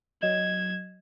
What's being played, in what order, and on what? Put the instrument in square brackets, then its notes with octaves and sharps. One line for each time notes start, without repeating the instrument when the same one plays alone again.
[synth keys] F#3 D#5 E7 [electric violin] G#6